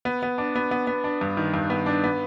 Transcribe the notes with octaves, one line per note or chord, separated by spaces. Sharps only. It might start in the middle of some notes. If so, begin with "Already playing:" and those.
B3
B3
D4
B3
B3
B3
D4
G2
D#3
G2
B3
D4
B3